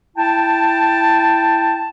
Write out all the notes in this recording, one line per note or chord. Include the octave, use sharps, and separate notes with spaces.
E4 G5 A5